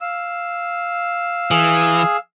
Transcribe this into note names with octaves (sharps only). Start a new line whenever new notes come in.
F5 E6
E3 G#4